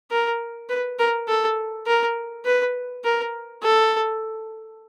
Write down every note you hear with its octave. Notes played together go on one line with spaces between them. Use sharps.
A#4
B4
A#4
A4
A#4
B4
A#4
A4